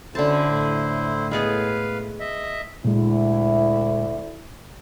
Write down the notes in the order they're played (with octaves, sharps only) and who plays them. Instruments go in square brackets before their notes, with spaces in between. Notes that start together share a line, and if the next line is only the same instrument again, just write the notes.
[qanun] D3 A5 [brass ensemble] C#4 F#4 A4 [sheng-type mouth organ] E4 C5
[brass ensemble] A2
[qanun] G#3 B3 G#4 [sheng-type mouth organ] B4 F5
[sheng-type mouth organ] D#5 E5
[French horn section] D2 E4 [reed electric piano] A#2 G#3